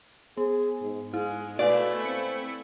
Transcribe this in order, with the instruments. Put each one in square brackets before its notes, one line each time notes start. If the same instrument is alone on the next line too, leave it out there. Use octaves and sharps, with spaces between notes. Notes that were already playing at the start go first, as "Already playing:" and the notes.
[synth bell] B3 [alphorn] G#4
[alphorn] G#2
[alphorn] G#2 [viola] G#3 [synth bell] E4
[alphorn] B2 [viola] A3 E4 [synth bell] B4 F5 G#5 [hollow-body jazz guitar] D5
[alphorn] C4 [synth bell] C#7